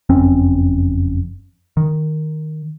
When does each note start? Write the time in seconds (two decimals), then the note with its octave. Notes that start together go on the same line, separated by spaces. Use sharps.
0.09 F#1 F2 C4 C#4
1.77 D#3